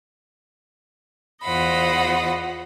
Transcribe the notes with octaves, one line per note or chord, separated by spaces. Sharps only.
E2 F4 C5 D#5 F#5 B5